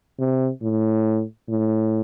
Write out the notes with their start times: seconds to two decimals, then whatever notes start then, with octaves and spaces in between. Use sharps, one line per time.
0.19 C3
0.62 A2
1.49 A2